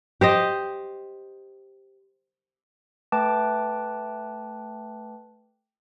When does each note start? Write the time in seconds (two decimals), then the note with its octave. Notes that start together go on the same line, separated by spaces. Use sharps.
0.21 G4 C5 D#5
3.12 A3 B4 G5 A5 D6